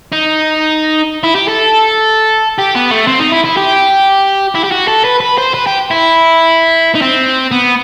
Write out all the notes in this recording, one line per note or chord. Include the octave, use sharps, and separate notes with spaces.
D#4
E4
G4
A4
G4
B3
A3
C4
D#4
E4
E4
G4
E4
G4
F#4
A4
B4
B4
C5
B4
G4
E4
D#4
C4
B3